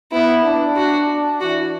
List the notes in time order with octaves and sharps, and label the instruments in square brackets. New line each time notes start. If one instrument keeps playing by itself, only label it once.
[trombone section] B3 [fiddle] E4
[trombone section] D4
[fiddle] F#4
[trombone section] D4
[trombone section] E3 [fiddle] F#4